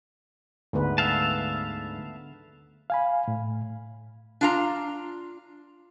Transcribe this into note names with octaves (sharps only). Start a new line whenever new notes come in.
D2 G#2 D3 B3 B4
E5 F5 A5
F5 G#5 B5
A2
D4 F4 A#5